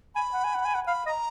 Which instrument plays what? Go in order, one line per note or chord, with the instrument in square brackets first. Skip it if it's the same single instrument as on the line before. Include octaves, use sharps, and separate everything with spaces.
[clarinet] G#5 [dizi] B5
[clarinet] F#5
G#5
F#5
G#5
F#5
[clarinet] F5 [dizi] B5
[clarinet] D#5 [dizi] B5
[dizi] A#5